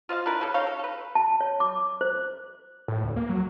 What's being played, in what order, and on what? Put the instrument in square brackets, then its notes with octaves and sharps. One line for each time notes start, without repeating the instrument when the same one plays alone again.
[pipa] F4 C5 D#5 F5
D4 E4 A#4 B4
C#3 A4
C#4 D#4 C#5 F5
A4
A4 B4
[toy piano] A5
C#5
D6
C5
[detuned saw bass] A2
D2
A#3
F#3